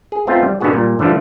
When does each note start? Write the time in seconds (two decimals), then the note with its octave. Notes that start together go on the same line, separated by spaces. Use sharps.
0.12 G#4
0.27 A3 B3 C4 D#4 F4
0.43 G3
0.60 B2 D3 D#3 B3 F#4 G#4
0.73 A#2 G3
0.99 D3 E3 F3 G3 A3